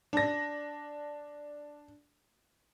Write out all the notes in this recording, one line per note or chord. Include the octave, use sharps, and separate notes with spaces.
D4 A#6